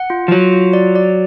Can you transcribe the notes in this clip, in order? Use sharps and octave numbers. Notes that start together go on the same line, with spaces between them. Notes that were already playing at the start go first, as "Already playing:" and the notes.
Already playing: F#5
F4
F3
F#3 F4
F4
D5
D5